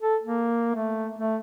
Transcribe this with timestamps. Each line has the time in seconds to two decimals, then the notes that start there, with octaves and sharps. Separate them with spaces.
0.02 A4
0.23 A#3
0.75 A3
1.19 A3